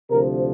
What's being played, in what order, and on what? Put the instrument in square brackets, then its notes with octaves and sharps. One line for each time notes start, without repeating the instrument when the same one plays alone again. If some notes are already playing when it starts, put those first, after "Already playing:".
[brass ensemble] D2 C3 F3 A#4